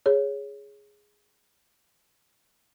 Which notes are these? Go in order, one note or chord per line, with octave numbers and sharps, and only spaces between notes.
G#4 C#5